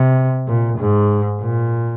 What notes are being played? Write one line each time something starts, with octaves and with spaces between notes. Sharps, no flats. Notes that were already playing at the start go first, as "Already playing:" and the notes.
Already playing: C3
A#2
G#2
A#2